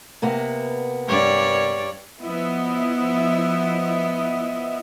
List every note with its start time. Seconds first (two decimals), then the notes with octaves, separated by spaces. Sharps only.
0.22 C3 A#3 B3
1.07 G2 C#5 D5
2.21 F3 B3 E4 D#5 E5